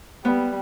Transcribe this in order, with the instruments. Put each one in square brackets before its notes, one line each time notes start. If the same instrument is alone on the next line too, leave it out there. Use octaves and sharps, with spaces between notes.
[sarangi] G3 [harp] B3